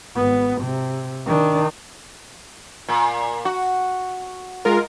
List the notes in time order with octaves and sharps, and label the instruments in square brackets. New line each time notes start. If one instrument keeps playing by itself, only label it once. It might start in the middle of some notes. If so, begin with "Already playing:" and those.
[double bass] G#1 B3
C3
D#3 D4
[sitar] A#2
F#4
[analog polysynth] G#3 F4 A#4